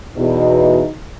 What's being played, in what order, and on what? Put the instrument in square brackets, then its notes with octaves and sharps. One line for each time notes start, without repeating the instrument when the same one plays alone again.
[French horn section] E2 B2 [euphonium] D#4